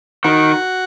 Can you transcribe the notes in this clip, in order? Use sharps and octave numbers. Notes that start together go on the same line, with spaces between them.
D#3 F#4 F#5